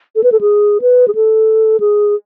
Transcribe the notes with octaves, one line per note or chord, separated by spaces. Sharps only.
A4
B4
A4
G#4
B4
G#4
A4
G#4